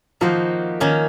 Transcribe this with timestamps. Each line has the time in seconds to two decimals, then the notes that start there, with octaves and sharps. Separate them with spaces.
0.21 D#3 F3 A#3 D#4 F#4 C5
0.80 D#3 A#3 C#4